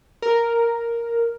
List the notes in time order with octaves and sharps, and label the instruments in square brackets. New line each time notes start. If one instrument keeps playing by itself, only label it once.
[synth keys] A#4